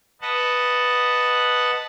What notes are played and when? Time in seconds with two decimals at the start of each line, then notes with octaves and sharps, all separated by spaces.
0.21 B4 D#5 F#5 A5